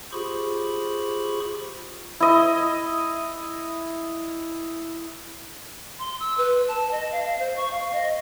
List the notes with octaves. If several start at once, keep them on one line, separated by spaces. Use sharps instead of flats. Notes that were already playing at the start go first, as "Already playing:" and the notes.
F4 G4 G#4 C5 B5 C#6
E4 D#5
C6
E6
B4
A5
D#5
F5
F5
C5
C#6
F5
D#5